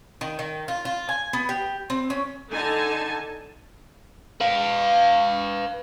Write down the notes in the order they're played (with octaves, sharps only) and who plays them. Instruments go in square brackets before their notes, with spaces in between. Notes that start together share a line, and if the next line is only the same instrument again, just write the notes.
[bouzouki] D#3
D#3
F4
F4
G#5
B3
G4
C4
C#4
[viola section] D3 D#4 G#5 A5
[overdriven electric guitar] B4 F5